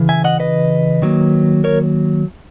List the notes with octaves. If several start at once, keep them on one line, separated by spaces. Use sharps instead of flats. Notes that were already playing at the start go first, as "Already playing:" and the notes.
Already playing: C#3 E3
E5 G#5
D#5 F#5
B4 D#5
D#3 F#3 A#3
A#4 C#5